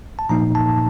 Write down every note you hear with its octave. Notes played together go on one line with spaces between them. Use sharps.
A5
A#2 F3 A#3 D#4 A#5
A5